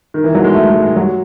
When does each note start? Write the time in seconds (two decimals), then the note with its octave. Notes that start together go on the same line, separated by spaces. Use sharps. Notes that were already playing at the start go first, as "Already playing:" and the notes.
0.14 D#3
0.24 E3
0.35 F#3
0.44 G#3
0.54 A3
0.69 G#3
0.82 G#3
0.96 F#3